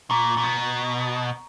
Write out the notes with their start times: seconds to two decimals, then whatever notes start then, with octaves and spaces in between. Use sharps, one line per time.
0.10 A#2 A#5 C#6
0.38 A#2
0.43 B2